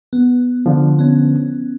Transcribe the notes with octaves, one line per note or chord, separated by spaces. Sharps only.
B3
D3 F3
B3 C#4